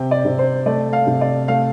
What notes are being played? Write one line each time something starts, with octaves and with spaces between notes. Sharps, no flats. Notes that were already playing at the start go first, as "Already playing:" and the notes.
Already playing: C3 G5
D5
C3
C5
A3 D5
F5
C3
D5
A3 F5